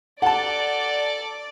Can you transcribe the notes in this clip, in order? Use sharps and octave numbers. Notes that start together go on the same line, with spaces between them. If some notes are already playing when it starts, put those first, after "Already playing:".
A4 D5 F#5 A5